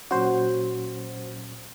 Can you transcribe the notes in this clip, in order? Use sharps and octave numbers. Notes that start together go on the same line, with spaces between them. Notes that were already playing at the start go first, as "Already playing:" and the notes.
A#2 F#3 C#4 F#4 C5